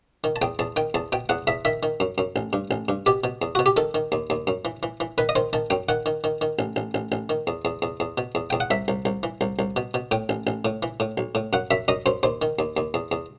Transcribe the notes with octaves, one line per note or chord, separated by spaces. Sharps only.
D#3
A5
E2 G5
E2 A5
D#3 G5
E2 A5
B2 G5
E2 F#5
E2 E5
D#3 E5
D#3
F#2
F#2
A1
G2
A1
G2
B2 G4
B2
E2
B2 F#4
G4
D#3 A4
D#3
D#2
D#2
F#2
E3
E3
E3
D#3 B4
D#5
D#3 C5
D#3 A5
F#2 G5
D#3 F#5
D#3
D#3
D#3
A1
A1
A1
A1
D#3
E2
E2
E2
E2
B2
E2
E2 G5
F#5
C2 E5
C2
C2
E3
C2
C2
B2
B2
A2 G5
A1
A1
A2
E3
A2
B1
A2
F#2 F#5
F#2 E5
F#2 D#5
F#2 C5
D#2 C5
D#3
D#2
D#2
E2
E2